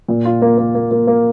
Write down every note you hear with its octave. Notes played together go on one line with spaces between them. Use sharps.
A#2
F4
A#3
A#3
A#3
A#3
A#3